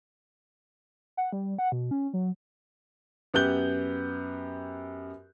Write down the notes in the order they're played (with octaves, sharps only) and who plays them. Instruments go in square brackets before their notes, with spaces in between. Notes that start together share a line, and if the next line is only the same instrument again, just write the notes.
[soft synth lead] F#5
G3
F#5
B2
C#4
F#3
[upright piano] F#2 B3 G4 F#6 G6 G7